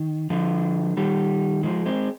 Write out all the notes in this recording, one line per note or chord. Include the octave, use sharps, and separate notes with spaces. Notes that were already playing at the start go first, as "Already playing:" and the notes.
Already playing: D#3
D3 F3
D#3 G3
F3 G#3
G#3 C4